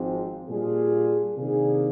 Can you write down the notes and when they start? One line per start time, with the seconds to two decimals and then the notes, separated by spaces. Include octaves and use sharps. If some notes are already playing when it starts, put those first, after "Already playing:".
Already playing: G#1 G#2 F3 C4
0.48 A#2 G3 D4 F4 G#4
1.36 C3 D#3 A#3 D4 G#4